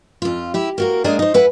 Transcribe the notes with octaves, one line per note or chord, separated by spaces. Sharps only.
F2 F4
E4 G4
A#3 F#4 A#4
G#3 A#3 D4 G#4 D5 G#5
D#4 C5
E4 B4 F#5 G#5